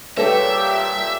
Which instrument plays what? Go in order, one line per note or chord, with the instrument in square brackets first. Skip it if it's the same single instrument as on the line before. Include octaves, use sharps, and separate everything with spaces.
[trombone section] A#2 G4 [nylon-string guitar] G3 A4 C#5 [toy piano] B4 [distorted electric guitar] E5